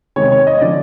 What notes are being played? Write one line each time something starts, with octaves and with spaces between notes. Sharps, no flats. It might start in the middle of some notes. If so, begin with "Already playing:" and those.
C3 D#3 G#3 C#5
C#5
D#5
D3 F3 D5